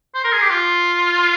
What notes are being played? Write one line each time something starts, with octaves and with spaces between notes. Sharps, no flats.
C5
A#4
G#4
G4
F4